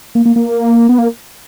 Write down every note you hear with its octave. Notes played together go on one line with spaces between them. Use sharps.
A#3
A#3
A#3
B3
A#3